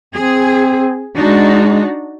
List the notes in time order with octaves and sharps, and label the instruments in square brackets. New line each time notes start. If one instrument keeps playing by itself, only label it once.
[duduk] C4 [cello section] G#4
[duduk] G#3 [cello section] D4 D#4 F#4